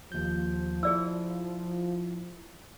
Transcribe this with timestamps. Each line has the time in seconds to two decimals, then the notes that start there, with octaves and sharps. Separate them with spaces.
0.12 D#2 F3 G6
0.83 E4 G#4 D5 E6